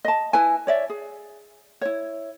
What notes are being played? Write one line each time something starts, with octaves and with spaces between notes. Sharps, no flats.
D#5 A5
E4 B4 G#5
C#5 D5 E5
G#4
E4 C#5